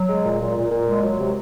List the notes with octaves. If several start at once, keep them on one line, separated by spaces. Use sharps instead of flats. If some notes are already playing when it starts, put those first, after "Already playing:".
Already playing: F#3
G#3
A#2
A#2
A#2
A#2
G#3
F#3
C3